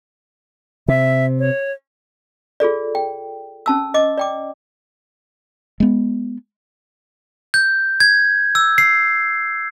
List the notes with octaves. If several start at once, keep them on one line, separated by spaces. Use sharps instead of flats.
C3 E5
C#5
F4 G#4 A4 D5
G5
C#4 A5 E6
D#5 D6
D5 G5 D6
G#3 B3
G6
G#6
E6
C7